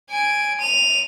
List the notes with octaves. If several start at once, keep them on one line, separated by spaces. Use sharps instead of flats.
G#5 D7
D#7 F7